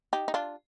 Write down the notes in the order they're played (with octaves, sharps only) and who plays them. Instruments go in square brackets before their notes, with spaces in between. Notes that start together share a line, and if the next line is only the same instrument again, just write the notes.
[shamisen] D#4 G4
D#4
D4 F4